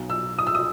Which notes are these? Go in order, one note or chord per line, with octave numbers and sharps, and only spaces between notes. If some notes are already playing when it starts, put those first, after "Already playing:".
Already playing: B1 B2 F#3
E6
D#6
E6
D#6